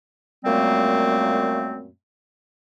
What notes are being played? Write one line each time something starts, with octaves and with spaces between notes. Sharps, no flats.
F#2 A#2 G3 A3 A#3 C4